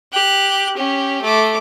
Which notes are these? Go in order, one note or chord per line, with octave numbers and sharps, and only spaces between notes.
G4 F#6
C#4 G4
A3 D6